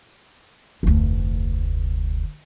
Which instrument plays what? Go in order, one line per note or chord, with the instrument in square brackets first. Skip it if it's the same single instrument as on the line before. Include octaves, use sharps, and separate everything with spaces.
[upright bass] F1 D2